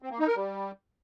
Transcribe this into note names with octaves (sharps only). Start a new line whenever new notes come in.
C4
A#3
D#4
A#4
G3